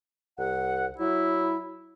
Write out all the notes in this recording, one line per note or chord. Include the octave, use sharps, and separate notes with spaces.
C2 F#5
F#3 E4